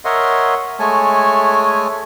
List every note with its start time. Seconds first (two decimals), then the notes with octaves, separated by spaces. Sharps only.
0.05 A#4 C#5 D#5 E5 F#5 C6
0.80 G#3 A3 C#5 G#5 A5